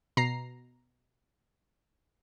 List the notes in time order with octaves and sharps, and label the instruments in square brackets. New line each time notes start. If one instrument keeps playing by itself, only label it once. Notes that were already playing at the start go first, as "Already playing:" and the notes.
[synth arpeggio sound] B2 A#5 C7